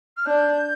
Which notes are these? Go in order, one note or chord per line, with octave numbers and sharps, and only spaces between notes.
F6
D4 G6